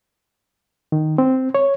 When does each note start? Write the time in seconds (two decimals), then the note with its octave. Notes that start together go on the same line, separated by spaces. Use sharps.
0.92 D#3
1.18 C4
1.55 C#5